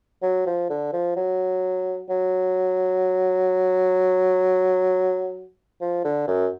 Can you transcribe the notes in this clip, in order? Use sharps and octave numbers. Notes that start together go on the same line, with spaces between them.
F#3
F3
D3
F3
F#3
F#3
F3
D3
F#2